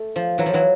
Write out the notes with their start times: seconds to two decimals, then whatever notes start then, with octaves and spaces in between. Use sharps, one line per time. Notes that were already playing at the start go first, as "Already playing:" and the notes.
Already playing: A3
0.16 F3
0.38 E3 F#3
0.46 F3
0.53 E3 F#3